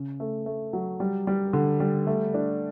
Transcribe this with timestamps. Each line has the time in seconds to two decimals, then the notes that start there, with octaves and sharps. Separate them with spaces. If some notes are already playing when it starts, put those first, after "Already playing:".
Already playing: C#3
0.20 A3
0.46 A3
0.73 F#3
1.00 G3
1.27 G3
1.53 D3
1.80 G3
2.07 A3
2.34 D4